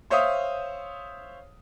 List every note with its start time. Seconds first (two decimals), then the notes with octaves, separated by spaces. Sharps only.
0.10 C5 C#5 E5 F5 D#6